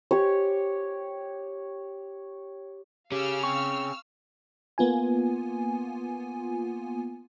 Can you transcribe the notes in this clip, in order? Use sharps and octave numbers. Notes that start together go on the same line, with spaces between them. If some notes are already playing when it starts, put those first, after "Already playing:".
G4 C#5
C#4 G4 G#4 F5 E6 F6
C4 C#6
A#3 B3 F4 G#5